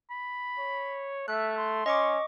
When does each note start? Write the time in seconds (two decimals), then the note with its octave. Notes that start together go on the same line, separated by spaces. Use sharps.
0.10 B5
0.59 C#5
1.28 A3 E5 F#6
1.57 C6
1.86 C#4 D#5 C#6 D6